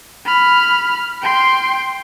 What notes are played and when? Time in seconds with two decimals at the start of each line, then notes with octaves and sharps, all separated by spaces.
0.25 B5 F6
1.21 G5 C6